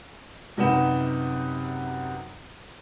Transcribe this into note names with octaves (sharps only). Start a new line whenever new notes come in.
F#2 C3 D#4 B4 F#5 E7